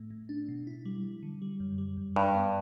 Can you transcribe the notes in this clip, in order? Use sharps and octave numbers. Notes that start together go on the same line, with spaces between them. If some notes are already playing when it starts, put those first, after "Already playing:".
Already playing: A2 A3
A2
D4
B2
E4
G3
G3
D3
G3
F#2
G3
F#2
G2 G3
B3